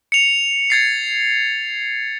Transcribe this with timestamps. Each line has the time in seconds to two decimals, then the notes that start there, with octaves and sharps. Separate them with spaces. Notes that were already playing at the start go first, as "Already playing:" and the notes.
0.12 C#7 F7
0.70 G#6 A6 C7